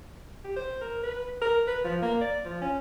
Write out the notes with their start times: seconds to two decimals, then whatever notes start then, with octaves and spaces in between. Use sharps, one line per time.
0.44 G4
0.56 C5
0.81 A#4
1.03 B4
1.41 A#4
1.67 B4
1.84 F3
2.02 A#3
2.21 D5
2.45 F3
2.61 C#4